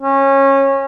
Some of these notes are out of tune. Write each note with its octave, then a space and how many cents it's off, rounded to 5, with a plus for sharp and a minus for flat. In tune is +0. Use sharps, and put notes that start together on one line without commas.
C#4 -20